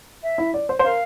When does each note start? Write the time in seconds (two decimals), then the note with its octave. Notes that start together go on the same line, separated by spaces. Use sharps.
0.23 E5
0.38 E4
0.54 D5
0.69 C5
0.79 C5
0.84 A#4 F5